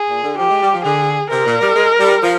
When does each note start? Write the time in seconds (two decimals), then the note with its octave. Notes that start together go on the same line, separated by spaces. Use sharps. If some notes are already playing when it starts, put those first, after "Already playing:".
Already playing: G#4
0.09 A#2
0.24 D3
0.38 F3 G4
0.50 G#3
0.62 G3
0.73 F3
0.85 D3 G#4
1.30 C3 A#4
1.45 A#2
1.61 G3
1.76 G#3
1.99 G3
2.23 F3